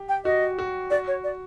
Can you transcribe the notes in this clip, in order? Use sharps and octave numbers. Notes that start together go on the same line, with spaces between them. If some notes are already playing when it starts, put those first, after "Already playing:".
Already playing: G4
G5
F#4 D#5
F#4
F#4 D5
C#5
D5